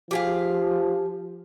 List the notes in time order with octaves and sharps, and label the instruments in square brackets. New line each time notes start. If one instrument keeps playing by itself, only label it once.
[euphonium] F3 [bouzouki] G4 G#4 F5